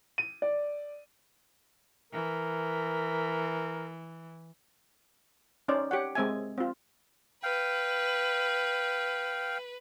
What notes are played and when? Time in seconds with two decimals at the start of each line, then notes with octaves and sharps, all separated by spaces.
0.18 D#7
0.42 D5
2.12 E3 A#4
5.68 C#4 D#4 C5 D5
5.91 G4 C#5 F#5
6.15 G#3 C4 E5 G#5
6.58 C4 F4
7.43 B4 F5 G5